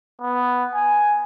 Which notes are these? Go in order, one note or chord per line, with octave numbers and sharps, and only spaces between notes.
B3
G#5